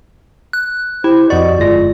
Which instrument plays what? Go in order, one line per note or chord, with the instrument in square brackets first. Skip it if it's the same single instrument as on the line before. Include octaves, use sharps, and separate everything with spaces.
[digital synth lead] F#6
[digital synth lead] E4 [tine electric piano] G4 [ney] C5
[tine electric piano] F2 F#4 C#6 [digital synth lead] D5 [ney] D#5
[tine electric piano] G1 G#3 A#6 [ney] F4